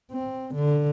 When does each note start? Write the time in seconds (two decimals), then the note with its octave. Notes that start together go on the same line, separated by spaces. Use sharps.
0.12 C4
0.55 D3